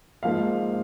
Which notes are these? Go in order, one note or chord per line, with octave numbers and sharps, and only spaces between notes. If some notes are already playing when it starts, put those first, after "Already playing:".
G#2 F3 A#3 F5